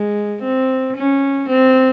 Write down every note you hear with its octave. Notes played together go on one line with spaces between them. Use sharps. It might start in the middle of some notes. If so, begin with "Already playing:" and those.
Already playing: G#3
C4
C#4
C4